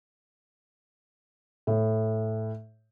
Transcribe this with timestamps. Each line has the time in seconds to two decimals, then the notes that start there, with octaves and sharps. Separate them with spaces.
1.67 A2